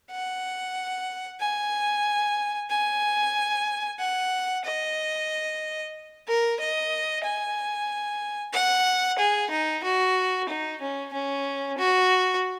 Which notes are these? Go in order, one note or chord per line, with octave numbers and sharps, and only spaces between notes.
F#5
G#5
G#5
F#5
D#5
A#4
D#5
G#5
F#5
G#4
D#4
F#4
D#4
C#4
C#4
F#4